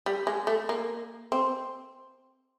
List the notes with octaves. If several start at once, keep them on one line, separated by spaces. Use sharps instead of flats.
G3
G#3
A3
A#3
C4